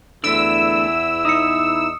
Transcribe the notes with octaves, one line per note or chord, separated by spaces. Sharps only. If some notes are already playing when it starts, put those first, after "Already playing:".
E2 D3 A3 E4 E6 D7
D#4 D#6 C#7